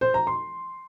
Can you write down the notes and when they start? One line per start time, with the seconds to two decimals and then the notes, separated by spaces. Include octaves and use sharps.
0.01 C5
0.14 A#5
0.27 C6